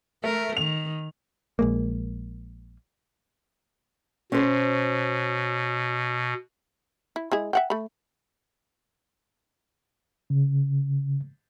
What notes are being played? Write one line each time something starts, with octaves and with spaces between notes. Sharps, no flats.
A3 A#4
D#3 F7
A#1 G#3 A#3
B2 C#4 C5
E4
G#3 E4 G#4
E5 F#5 G5
A3 B5
C#3